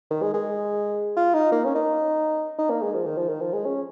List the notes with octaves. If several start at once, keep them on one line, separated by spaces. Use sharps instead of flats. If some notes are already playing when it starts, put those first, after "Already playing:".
D#3
G#3
G#3
F4
D#4
A#3
C#4
D#4
D#4
A#3
G#3
F3
D#3
F3
D#3
F3
G#3
C#4